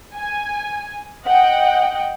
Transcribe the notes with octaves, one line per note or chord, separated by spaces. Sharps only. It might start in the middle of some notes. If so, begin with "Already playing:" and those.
G#5
D#5 F#5 G5